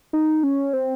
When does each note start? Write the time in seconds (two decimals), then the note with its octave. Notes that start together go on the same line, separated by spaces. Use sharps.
0.13 D#4
0.43 C#4
0.73 C4